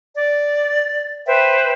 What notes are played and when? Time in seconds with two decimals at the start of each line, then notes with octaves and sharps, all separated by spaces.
0.14 D5
1.26 B4 C5 E5 G5